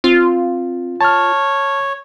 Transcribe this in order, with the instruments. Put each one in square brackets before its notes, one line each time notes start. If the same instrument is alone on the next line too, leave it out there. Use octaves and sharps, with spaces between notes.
[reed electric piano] C4 [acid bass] F4
[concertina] C#5 [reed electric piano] A5 F6